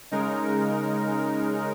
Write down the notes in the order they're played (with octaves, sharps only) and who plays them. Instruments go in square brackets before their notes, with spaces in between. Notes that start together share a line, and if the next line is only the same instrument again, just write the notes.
[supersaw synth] C#3 G#3 D#4 A#4